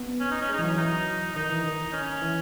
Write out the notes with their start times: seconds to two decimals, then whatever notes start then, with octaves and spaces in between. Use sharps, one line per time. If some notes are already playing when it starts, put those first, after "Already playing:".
Already playing: B3
0.20 C#4
0.31 D#4
0.42 C#4
0.49 G#3
0.52 D#4
0.59 E3
0.63 F#3 C#4
0.77 E3 D#4
1.36 D#3 D#4
1.49 E3
1.64 D#3
1.93 C#4
2.22 E3